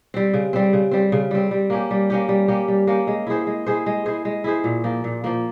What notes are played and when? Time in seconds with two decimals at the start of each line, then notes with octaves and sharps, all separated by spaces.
0.14 G3 C4
0.34 C#3
0.53 G3 C4
0.73 C#3
0.91 G3 C4
1.12 C#3
1.31 G3 C4
1.51 G3
1.70 A#3 C#4 G4
1.91 G3
2.10 A#3 C#4 G4
2.29 G3
2.48 A#3 C#4 G4
2.68 G3
2.87 A#3 C#4 G4
3.07 G#3
3.27 E4 G#4 C5
3.47 G#3
3.66 E4 G#4 C5
3.86 G#3
4.06 E4 G#4 C5
4.25 G#3
4.44 E4 G#4 C5
4.64 A#2
4.84 F3 A#3
5.04 A#2
5.24 F3 A#3